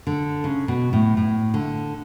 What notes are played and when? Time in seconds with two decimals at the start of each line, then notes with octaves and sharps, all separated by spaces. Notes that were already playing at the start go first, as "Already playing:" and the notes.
0.07 D3
0.44 C#3
0.68 B2
0.93 A2
1.17 A2
1.54 D3